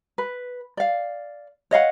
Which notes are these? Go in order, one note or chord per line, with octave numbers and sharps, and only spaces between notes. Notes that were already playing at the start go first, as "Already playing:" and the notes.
B4
D5 F5
C#5 D#5 F5 F#5